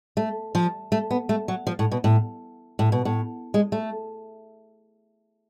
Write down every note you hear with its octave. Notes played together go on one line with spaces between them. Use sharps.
A3
F3
A3
B3
A3
F#3
F3
A2
B2
A2
A2
B2
A2
G#3
A3